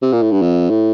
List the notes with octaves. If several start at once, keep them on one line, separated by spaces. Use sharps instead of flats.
C3
A#2
A2
G2
F2
A2